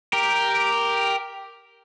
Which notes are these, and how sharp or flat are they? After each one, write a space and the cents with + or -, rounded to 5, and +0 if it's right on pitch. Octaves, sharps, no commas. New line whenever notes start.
G4 +0 A#4 +0